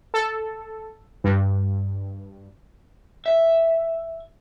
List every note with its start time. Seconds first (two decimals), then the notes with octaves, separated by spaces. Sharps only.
0.14 A4
1.24 G2
3.26 E5